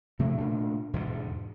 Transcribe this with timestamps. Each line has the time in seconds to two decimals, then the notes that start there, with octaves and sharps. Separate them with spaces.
0.19 C3 F3 A3 A#3
0.37 A#2 A3 D4
0.93 E2 G#2 B2 D3